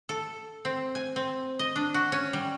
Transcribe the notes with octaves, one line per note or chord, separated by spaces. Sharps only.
A4
C4
G#5
C4
D#5
D4
F#4
C#4
G3